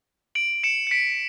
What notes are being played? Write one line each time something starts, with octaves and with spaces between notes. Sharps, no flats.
D7 F#7
C#7 E7
C#7
B6 D7